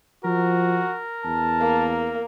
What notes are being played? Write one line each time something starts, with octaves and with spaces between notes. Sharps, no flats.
F3 F#4 A#4
E2 A5
A#3